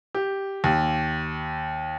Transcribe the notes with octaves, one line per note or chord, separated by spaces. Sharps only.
G4
D#2